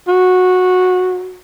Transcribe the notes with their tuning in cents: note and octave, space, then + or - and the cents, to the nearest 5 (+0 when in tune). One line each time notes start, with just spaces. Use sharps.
F#4 -15